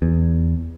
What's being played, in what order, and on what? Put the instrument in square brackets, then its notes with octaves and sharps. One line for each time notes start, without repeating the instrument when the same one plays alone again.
[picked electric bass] E2